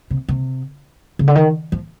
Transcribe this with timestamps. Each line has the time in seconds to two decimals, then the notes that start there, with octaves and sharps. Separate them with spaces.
0.10 C3
0.29 C3
1.19 C#3
1.28 D3
1.35 D#3
1.72 F3